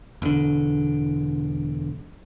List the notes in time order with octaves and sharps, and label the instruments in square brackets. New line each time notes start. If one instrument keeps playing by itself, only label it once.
[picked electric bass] E1 D3